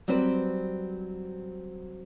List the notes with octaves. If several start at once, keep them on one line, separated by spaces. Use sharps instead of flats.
F#3 G3 C4 B4 C5